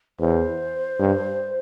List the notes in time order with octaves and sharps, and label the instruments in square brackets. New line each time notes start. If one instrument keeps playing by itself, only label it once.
[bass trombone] E2 [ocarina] C5
[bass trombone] G2